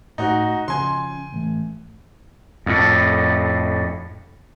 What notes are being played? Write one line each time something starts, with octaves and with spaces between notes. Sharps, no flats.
A2 D#4 F#4
C#3 F3 G#5 C6
A1 A3
F2 A2